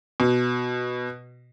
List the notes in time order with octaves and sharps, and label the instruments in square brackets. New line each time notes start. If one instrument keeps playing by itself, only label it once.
[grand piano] B2